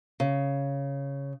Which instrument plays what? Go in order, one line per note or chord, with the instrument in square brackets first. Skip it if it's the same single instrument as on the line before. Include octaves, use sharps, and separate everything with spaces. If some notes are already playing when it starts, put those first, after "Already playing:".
[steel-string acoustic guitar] C#3